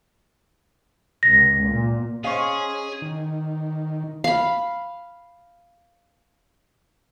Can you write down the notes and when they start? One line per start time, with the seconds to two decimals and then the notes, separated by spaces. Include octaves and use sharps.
1.23 C#2 A#6
1.62 A#2
2.24 C#4 G#4 C5 D#5 F5 C#6
3.02 D#3
4.24 F5 B5